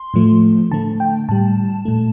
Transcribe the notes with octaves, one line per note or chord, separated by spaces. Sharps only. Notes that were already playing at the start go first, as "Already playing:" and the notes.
Already playing: C6
A2 F3 A3
D3 A3 A5
G5
A2 G3 A5
A#2 A3